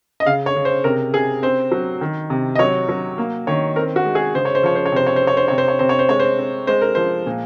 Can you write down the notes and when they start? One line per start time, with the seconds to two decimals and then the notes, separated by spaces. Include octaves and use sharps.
0.20 D#5
0.26 C#3 F5
0.46 C#5
0.56 C#3
0.65 C5
0.84 C3 A#4
1.14 C3 G#4
1.43 C4 C5
1.71 F#3
2.01 D#3
2.30 C3
2.55 D#5
2.59 F#3 C#5
2.89 F#3
3.18 A#3
3.47 D#3 C#5
3.76 C4 A#4
3.96 F#4
4.05 G#3
4.15 G#4
4.34 C#3 C5
4.45 C#5
4.55 C5
4.63 F3 C#5
4.75 C5
4.85 C#5
4.92 C3 C5
5.06 C#5
5.16 C5
5.22 C4
5.27 C#5
5.37 C5
5.48 C3 C#5
5.58 C5
5.68 C#5
5.79 C3 C5
5.89 C#5
5.99 C5
6.09 G#3 C#5
6.20 C5
6.39 C4
6.67 G#3 C5
6.81 A#4
6.95 F3 C5
7.26 A#2